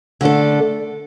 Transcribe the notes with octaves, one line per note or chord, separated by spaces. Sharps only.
D3 A3 D4 A4